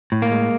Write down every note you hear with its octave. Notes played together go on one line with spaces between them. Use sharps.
A2
A#3
G#3